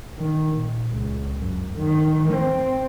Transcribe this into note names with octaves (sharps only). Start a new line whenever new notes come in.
D#3
A#2
C#2
F#2
D#3
C4